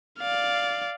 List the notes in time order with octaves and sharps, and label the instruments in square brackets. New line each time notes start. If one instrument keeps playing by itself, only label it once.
[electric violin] D5 F5